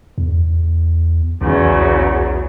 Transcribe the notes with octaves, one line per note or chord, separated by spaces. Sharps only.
E2
B1 E2 C#3 F#3